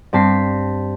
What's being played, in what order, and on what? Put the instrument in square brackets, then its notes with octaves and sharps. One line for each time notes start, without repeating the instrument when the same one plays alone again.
[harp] G2 C4 A5 B6 C7